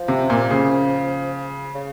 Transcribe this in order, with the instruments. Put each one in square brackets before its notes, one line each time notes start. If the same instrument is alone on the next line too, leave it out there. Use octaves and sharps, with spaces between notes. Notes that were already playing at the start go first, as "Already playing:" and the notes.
Already playing: [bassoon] F3
[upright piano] C3
A#2
C#3
[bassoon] C#3